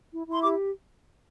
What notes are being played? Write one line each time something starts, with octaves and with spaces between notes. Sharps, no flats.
E4
E4
C6
G4 D6